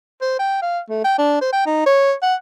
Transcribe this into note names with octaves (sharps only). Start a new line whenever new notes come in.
C5
G5
F5
A3
G5
D4
C5
G5
D#4
C#5
F#5